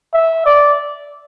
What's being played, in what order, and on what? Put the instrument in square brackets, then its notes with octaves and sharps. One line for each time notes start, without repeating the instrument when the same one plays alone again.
[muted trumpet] E5
D5